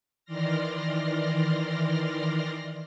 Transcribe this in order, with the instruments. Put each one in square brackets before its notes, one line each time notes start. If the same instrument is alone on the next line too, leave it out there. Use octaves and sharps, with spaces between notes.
[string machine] D#3 E3 D5 C6 F6 A#6